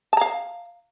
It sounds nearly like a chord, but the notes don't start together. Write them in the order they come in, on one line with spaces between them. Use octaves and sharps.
A5 A#5 F5